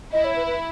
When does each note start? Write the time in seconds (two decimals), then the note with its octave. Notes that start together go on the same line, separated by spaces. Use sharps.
0.12 E4 D#5
0.24 C#5
0.35 B4
0.46 B4